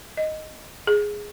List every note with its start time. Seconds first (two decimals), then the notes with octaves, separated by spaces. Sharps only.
0.17 D#5
0.87 G#4